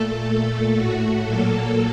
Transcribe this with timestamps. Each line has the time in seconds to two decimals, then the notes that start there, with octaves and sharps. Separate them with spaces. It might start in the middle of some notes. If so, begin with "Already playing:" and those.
Already playing: A#2 A3 A4
0.29 A#2 A3
0.76 A2 A3 F#4
1.23 A#2 F#3 A#3 A4